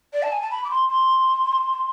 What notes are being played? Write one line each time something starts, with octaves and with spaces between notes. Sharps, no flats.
D5
A5
G#5
A5
B5
D6
C6
C6